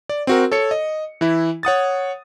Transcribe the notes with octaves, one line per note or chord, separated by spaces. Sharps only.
D5
C4 F#4 A#4
A4 C#5 C#7
D#5
E3 E4
C#5 F#5 D#6 A6